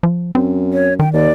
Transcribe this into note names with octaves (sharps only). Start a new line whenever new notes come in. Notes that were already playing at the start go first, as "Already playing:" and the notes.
F3
F#2 C4
C#5
D#3 G5
D#2 D5